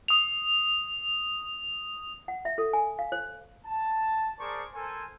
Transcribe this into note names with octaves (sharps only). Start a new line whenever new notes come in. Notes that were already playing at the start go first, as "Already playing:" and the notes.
D#6 F7
F#5
E5
A4
G#5
F5
C5
A5
G#4 A#4 C5 D5 A5 C#6
A4 A#4 C5 G#5